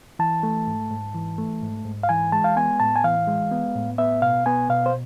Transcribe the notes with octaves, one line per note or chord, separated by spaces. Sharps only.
E3 A5
A3
G#2
G#2
E3
A3
G#2
G#2
F5
E3 G#5
G#3 A5
F5
B3 G#5
A2 A5
G#5
E3 F5
G#3
B3
A2
B3 E5
B2 F5
B3 G#5
B2 F5
C5